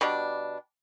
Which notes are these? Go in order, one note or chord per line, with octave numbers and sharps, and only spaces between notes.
B2 G3 D4